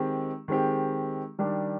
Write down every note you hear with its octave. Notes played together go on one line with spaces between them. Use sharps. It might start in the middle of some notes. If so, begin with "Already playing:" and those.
Already playing: D#3 G#3 C4 G4
D#3 G#3 C4 G4
D#3 G3 D4 G4